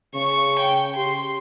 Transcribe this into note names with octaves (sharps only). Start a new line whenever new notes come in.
C#3 C#6
G5
G4 C6